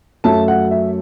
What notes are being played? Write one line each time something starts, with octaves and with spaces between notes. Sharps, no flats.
F#2 F#3 A3 A5
F#5
E5